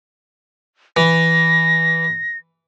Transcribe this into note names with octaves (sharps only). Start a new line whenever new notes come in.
E3 A#6